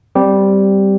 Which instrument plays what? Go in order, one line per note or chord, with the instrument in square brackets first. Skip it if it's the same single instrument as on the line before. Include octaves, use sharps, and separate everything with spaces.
[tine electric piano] G3 C4 G4